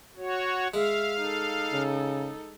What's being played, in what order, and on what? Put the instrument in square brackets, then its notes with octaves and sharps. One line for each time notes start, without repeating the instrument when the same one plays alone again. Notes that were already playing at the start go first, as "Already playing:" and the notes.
[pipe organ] F#4 C#5
[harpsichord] G#3 [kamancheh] E5 [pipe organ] F5
[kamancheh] D#4 A4
[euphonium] C#3